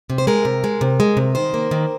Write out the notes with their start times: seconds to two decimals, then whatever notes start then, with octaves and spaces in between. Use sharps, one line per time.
0.10 C3
0.18 C5
0.27 G#3 A#4
0.45 C3
0.64 G#3
0.81 C3
1.00 G#3
1.17 C3
1.35 D#3 C5
1.54 A#3
1.71 D#3